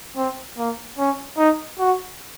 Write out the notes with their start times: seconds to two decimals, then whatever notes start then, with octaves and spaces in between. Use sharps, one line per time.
0.17 C4
0.58 A#3
0.98 C#4
1.38 D#4
1.79 F#4